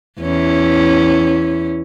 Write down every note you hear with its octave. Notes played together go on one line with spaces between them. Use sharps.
E2 C#4 E4